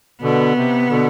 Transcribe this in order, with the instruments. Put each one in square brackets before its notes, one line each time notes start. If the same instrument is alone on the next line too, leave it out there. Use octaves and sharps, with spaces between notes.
[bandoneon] B2 D3 [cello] B3
[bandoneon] C3
B2 D3